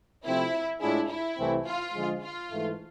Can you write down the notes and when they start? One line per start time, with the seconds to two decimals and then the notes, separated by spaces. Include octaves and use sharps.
0.24 C3 F3 A3 C4 E4
0.80 A2 G#3 D4 E4 F4 G#4
1.08 E4
1.37 C2 C3 E3 A3 C4
1.65 F4
1.94 D3 F3 G#3
2.21 F4
2.50 G#2 E3 A3